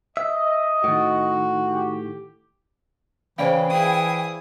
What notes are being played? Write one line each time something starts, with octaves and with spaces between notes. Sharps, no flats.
D#5 E5
A2 D#3 F#4
G4
C#3 E3 C5 D5 F5 G5
E4 G#4 D#6